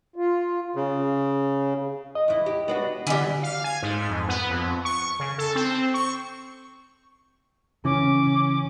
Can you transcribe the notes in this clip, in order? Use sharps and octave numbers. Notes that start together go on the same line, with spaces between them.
F4
C#3
D#5
E2 E4
G4
B3 D4 F#4
D3 E3 G3
F5
G#5
G#2
F2
B3
F2
C#6
C#3
A4
C4
C#6
C#3 E3 C#4 D6